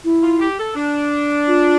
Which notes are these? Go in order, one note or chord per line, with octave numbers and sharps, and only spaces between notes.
E4
F4
G4
A4
D4
F4